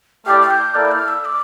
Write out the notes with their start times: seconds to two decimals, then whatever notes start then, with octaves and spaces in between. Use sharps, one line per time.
0.26 A3 E4 G4 D5 G5 F6
0.42 F6
0.50 G6
0.75 A#3 E4 A4 D5 F6
0.85 G6
0.91 F6
1.08 E6
1.25 D6